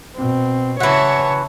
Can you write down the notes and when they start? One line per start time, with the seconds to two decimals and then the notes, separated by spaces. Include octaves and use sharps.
0.17 B2 C4
0.80 C#3 E3 F#4 C#5 E5 A5